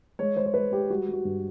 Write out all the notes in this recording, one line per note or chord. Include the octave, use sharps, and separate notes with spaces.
G#3 C#5
G#3 C5
C5
G#3 B4
G#3 G4
G3 F#4
G3
F#4
G2